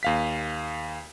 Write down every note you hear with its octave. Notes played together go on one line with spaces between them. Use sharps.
D#2 F5 B6